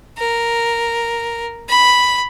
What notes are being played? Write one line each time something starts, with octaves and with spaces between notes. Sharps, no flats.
A#4
B5